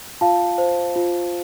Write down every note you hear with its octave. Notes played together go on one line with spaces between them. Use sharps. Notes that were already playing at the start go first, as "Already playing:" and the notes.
F4 F5 A5
C5
F4